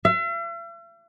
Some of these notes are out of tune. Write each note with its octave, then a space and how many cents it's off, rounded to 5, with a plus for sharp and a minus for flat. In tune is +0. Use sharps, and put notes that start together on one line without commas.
E5 +45